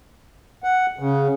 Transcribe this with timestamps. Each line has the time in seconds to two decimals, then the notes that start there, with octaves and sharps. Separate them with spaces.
0.64 F#5
0.99 C#3